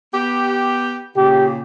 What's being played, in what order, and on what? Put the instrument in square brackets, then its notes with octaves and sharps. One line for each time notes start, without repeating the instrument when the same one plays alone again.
[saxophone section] B3 G4
[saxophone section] A#2 C#3 [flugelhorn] G4